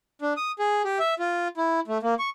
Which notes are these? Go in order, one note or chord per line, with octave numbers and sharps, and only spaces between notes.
D4
D#6
G#4
G4
E5
F4
E4
A3
A#3
C#6